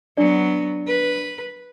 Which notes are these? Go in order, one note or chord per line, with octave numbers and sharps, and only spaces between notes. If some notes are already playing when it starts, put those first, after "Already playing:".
F#3 B3 D4 D5
B4